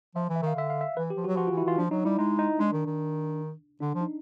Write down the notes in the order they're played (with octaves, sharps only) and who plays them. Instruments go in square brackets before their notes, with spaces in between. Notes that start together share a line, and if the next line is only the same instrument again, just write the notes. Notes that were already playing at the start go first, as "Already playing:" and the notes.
[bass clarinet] F3 [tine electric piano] E5
[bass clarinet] E3
[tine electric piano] E5
[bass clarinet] D#3 [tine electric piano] F5
[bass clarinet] D3 [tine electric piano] E5
[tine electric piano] F5
E5
[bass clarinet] E3 [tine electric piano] B4
[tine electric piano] G4
[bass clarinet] F3
[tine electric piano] F#4
[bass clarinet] F#3
[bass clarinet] F3 [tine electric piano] F#4
[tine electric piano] F4
[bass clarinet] E3
[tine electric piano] E4
[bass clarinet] E3 [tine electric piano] F4
[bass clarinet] F3 [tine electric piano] D4
[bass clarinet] F#3 [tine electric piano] D#4
[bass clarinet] G3 [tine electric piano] E4
[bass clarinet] G#3 [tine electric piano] D#4
[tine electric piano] D#4
[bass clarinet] G#3 [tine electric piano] D4
[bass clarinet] D#3
D#3
[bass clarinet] D3 [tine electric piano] D4
[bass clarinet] F3
[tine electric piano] D#4